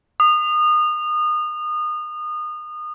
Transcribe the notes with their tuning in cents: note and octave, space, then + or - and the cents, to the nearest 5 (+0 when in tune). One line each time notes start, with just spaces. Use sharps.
D#6 -30